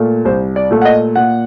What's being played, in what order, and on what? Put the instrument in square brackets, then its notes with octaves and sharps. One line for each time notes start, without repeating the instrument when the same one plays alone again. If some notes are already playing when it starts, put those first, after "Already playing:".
Already playing: [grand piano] A#2 A3
C2 C5
D5
A#2 A3
F#5
D#5
A#2 F#5